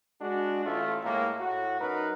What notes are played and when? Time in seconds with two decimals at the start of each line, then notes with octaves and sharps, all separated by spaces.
0.21 G#3 D4 F#4
0.65 A1 A3 F4
1.04 A2 G#3 A#3
1.40 A2 F#4
1.80 F#2 D#4 A#4 B4